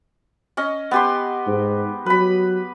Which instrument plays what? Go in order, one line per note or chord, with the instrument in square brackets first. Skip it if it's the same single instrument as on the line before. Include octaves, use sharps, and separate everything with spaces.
[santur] C#4 D#5
B3 G4 C6
[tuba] G#2
[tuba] F#3 [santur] B4 B5